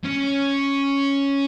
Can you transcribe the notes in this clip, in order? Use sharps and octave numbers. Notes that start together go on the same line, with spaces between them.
C#4